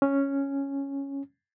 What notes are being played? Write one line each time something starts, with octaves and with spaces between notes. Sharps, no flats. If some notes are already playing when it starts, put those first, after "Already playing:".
C#4